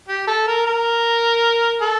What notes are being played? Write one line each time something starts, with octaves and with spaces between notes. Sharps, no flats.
G4
A4
A#4
A#4
A4